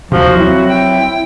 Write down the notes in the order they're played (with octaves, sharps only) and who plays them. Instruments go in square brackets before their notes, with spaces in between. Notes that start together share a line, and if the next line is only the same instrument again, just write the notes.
[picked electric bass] D#2 C3 [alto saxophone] F3 [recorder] F#4
[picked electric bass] F#3 C4 [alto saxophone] E4
[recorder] G5